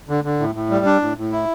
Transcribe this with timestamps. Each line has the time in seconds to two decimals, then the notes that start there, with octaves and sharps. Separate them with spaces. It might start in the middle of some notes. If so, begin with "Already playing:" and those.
0.09 D3
0.24 D3
0.40 A2
0.55 A2
0.70 G3
0.86 D4
1.02 A2
1.17 A2
1.32 E4